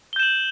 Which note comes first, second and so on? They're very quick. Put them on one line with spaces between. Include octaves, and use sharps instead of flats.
G7 G6 E7 F#7